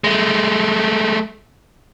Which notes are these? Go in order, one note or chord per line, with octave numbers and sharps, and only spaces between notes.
G#3 A3